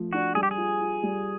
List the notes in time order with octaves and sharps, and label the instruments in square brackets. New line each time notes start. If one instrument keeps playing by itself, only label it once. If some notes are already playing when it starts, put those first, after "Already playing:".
Already playing: [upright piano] F3 A3
[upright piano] D4 [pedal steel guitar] F#4
[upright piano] G3 [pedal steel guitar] G#4
[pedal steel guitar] G4
G#4
[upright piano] F4
F4
G3